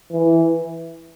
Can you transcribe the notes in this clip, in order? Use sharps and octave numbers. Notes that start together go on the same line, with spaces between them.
E3